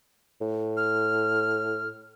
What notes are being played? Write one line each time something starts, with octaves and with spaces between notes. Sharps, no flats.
A2
F6